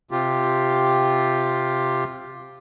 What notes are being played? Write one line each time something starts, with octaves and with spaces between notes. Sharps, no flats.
C3 F4 G4